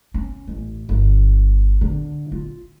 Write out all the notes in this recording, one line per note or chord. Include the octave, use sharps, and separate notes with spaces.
C#4
A1
G1
D3
F4